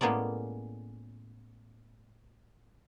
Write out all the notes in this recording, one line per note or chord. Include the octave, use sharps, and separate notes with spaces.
A2 G#3 A#3 B3 C#4 D5